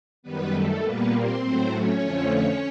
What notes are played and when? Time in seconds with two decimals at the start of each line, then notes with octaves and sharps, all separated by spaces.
0.23 F#2 D#3 G3 B3 B4
0.52 A3 A4
0.82 A#2 G3 A#3 B3 B4
1.11 C4 C5
1.41 A2 F#3 A3
1.70 C#4 C#5
1.99 F2 D3 F3 A3